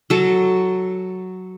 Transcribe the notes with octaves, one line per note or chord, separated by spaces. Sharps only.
F#3 A4